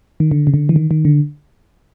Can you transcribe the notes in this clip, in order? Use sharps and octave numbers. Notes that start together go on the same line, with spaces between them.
D#3
D3
C#3
D3
E3
D#3
D#3
D3